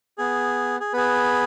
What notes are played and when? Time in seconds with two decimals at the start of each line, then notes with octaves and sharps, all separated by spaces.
0.18 B3 G#4
0.80 G#4
0.93 B3 G#4 B4